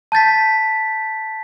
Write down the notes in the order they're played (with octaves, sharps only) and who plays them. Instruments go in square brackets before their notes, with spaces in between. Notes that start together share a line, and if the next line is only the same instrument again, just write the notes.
[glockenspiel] A5 G6 A6 B6